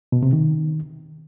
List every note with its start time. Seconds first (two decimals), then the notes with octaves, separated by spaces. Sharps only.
0.12 B2
0.23 C3
0.33 D#3